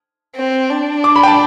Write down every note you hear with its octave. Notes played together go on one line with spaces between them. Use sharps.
C4
D4
D6
B5
G5
A5